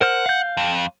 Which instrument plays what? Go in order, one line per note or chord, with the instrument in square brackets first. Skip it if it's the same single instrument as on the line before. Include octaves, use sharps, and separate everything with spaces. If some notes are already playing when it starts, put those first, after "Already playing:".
[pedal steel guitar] A#4 C5 F6 [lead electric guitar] F#5
[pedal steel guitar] F5 G6
[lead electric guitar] F2